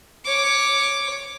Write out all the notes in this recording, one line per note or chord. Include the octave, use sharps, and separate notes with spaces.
C#5 D6